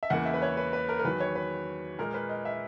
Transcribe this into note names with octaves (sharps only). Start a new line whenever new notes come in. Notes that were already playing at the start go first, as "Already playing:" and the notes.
E5
E2 C#3 E3 A#3 F#5
E5
B4
C#5
B4
B4
A#4
A#4
E2 D#3 F#3 B4
C#5
B4
A#2 G#3 A#4
B4
D#5
E5